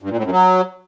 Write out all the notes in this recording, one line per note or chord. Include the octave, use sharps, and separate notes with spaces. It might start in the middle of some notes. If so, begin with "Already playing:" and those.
G2
A#2
A2
F#2
F#3